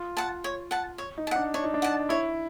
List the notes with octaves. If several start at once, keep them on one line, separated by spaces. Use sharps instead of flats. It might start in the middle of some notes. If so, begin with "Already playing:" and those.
Already playing: F4
F#5 A5
C#5
F#5 A5
C#5
D#4
A5
D4 F#5
D4 C#5
D#4
D4
F#5 A5
E4 C#5